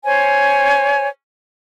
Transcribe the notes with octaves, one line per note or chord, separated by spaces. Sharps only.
C5 C#5 G#5